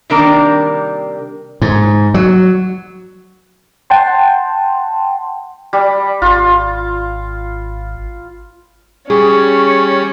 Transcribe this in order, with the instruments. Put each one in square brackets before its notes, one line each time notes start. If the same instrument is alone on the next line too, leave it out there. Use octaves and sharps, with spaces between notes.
[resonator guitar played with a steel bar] C3 D#3 G3 A#3 D4 A#4
[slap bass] G#2
F#3
[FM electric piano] F#5 G5 A5 C6
[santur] G3
[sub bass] G#1 [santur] F4
[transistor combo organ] G3 [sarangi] C#4 [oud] G#4 [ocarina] C#6